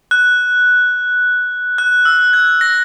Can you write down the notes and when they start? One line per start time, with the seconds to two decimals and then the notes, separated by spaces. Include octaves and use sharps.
0.11 F#6
1.78 F#6
2.05 E6
2.33 G#6
2.61 A#6